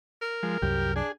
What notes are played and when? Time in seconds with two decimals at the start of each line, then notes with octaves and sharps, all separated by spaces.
0.21 A#4
0.43 F3 G#3
0.62 C2 F#2 G4
0.96 D4 G#4